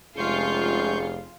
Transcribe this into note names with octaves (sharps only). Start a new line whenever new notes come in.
F1 C3 G#3 C#4 F4 G#4 C#6 G6